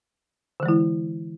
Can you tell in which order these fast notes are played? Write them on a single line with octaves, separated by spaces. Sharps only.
D3 E3 G#3 E4